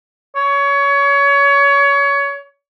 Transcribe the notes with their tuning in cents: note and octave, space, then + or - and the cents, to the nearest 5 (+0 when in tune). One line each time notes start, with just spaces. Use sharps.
C#5 +25